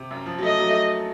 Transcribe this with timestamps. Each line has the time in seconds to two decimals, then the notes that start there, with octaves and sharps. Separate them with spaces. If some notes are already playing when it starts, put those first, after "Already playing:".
Already playing: C3
0.11 F#2
0.26 F3
0.38 F#3
0.43 A3 D#5
0.60 F#3
0.68 A3